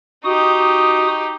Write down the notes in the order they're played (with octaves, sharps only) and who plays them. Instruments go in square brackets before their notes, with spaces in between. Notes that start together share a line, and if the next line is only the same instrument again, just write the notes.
[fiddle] D#4 G4 [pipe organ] F#4 D#6